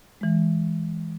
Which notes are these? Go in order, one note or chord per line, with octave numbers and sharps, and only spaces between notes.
E3 G#3